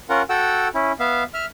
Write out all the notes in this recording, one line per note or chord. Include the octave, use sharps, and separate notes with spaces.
C#4 F4 A#4 F#5
F#4 A4 F#5 G5 E6
C#4 E4
B3 E5 F5
E5 F6